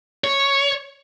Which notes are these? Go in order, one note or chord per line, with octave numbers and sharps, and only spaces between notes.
C#5